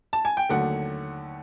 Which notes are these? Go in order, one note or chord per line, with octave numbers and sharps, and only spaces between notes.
A5
G#5
G5
D#2 D3 F#3 A3 F#5